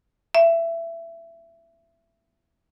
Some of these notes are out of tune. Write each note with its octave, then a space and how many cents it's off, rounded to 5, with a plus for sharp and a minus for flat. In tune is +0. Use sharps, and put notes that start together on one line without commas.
E5 +20